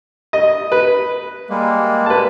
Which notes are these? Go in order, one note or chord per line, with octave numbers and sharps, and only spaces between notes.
D#5
B4
G3 G#3 A#3
B4 A5